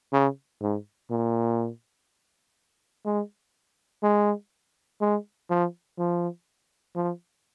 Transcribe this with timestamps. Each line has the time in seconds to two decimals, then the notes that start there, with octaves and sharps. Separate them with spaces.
0.13 C#3
0.61 G#2
1.10 A#2
3.06 G#3
4.03 G#3
5.01 G#3
5.50 F3
5.99 F3
6.96 F3